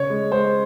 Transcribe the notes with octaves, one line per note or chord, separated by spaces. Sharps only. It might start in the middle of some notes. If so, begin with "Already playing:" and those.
Already playing: C#3 C#5
G#3
G#3 C5